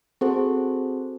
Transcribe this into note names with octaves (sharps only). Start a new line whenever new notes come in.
C4 F#4 G#4 A4 C5